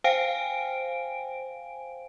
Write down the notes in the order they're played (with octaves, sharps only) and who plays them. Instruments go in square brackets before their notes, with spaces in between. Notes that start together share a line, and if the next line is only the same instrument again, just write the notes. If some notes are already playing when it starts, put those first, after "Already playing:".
[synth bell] C5 F5 G5 G#5 D7